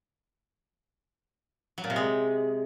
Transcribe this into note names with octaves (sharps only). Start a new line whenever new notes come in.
F#3
A#2
C3
G#3